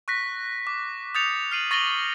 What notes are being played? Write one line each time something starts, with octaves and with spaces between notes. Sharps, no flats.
C#6 F#6 A#6 B6
D6
D#6 G6 A6 C#7 F7
F6 C7 D#7 F#7
C#6 A6 A#6 D#7 F#7 G7